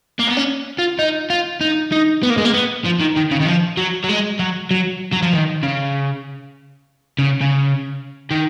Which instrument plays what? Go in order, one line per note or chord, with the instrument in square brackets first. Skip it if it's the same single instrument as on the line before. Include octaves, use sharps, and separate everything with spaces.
[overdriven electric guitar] A#3
B3
C#4
F4
D#4
F4
D#4
D#4
B3
A#3
G#3
A#3
B3
F3
D#3
D#3
C#3
D#3
F3
F#3
F#3
G#3
F#3
F#3
F#3
F3
D#3
C#3
C#3
C#3
D#3